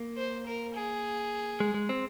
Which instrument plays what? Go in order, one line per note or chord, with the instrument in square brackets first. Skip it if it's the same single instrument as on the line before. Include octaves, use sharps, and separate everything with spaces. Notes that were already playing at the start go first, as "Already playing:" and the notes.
Already playing: [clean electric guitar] A#3
[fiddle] C5
A#4
G#4
[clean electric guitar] G#3
G#3
C4